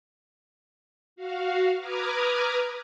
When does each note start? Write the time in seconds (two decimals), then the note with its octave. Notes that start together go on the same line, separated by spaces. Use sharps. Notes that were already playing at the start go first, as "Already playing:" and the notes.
1.16 F#4 F5
1.78 B4 A#5 D6 D#6 F6 G#6